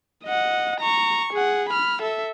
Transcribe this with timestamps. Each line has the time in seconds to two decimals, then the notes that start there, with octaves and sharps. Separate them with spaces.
0.24 D#5 F#5
0.80 A#5 C#6
1.33 G#4 F#5
1.69 B5 F6
2.02 A4 E5